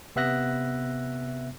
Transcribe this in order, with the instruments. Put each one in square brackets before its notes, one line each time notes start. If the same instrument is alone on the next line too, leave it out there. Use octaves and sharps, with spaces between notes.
[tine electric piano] C3 B3 E5 F#6 A#6